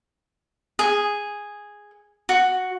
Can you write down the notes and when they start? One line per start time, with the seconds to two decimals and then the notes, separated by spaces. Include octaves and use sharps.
0.79 G#4
2.29 F#4